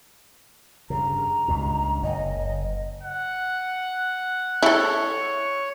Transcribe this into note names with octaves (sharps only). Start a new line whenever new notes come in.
G2 C#3 A#5
C#2 G2 A#2
F#1 D#5
F#5
E4 A4 C#5